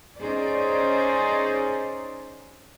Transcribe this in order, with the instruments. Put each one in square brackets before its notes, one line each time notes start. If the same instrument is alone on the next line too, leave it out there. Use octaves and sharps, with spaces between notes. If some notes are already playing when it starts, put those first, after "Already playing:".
[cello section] C#4 D#4 G#4 C5 D5